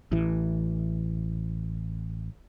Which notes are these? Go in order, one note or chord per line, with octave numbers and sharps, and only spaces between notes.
A1 E3